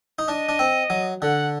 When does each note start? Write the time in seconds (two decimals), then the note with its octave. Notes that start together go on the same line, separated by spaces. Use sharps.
0.19 D#4
0.28 D4 D#5
0.49 D4
0.59 C4
0.90 F#3
1.22 D3 F#5